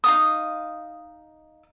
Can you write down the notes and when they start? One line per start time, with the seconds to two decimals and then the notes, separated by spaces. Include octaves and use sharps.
0.04 D#4 F5 D#6